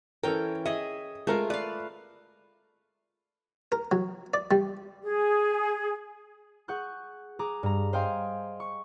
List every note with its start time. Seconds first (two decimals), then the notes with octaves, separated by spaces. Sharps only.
0.23 E3 C#4 A4 A#4 G5
0.66 G#4 D#5 E5
1.27 G#3 A3 F4 A#4
1.50 B4 D5 F5
3.72 A#4
3.92 F#3
4.34 D5
4.51 G3
5.04 G#4
6.68 G#4 F#5 C#6 F#6 G6
7.39 G#4 A#5 D6
7.63 G2 A#5
7.93 C5 D#5 F5 G5 G#5 C6
8.60 C#6